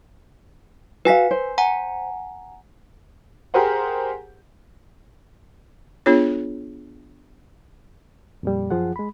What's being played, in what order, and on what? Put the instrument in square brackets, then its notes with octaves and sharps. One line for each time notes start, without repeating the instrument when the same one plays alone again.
[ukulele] F#4 F5 [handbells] B4 G#5 B6
[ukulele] C5
[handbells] F#5 G#5 A#5
[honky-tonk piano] G4 G#4 A#4 C5 F#5
[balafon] B3 D4 F4 G#4 C#5
[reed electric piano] F2 A#2 G3
F#2 F3 F4 G#4 F#5
G#3 B5